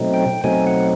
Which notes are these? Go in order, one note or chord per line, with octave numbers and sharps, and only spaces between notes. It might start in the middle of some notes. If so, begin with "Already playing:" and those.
Already playing: B2 F#3 A3 C4 D#4
G5
B2 F#3 A3 C4 D#4 G#5
F#5